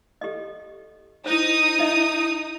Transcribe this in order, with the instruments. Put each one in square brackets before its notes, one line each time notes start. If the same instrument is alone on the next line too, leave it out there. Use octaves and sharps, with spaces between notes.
[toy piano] G4 A4 D#5
[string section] D#4 D#6 [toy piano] E4 C5
[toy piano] E4 D#5 E5